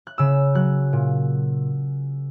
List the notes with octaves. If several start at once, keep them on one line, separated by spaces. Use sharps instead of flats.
F#6
C#3 E6
F#3 F#6
A#2